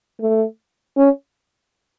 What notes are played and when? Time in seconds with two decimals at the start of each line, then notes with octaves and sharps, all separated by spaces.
0.20 A3
0.97 C#4